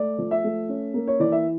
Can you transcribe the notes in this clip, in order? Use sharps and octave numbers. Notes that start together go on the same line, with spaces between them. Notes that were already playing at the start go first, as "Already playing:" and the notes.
Already playing: A3 D5
F3
E5
A3
C#4
A#3
C#5
E3 D5
E5